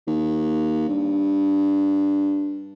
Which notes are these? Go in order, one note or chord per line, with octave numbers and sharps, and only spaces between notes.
D#2
G2